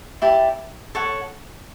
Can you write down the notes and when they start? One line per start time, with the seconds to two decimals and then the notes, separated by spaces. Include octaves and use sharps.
0.22 E4 G4 D5 A5
0.95 A4 C#5 F#5